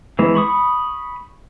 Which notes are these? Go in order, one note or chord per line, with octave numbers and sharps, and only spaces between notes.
E3 G#3 B3
B5 C#6 D#6